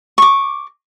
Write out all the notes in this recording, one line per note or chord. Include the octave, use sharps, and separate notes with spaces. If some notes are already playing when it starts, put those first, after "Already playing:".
C#6 D6